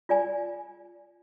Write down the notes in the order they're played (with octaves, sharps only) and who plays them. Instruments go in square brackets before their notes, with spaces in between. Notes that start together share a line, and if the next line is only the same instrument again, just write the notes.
[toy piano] F4 D5 G#5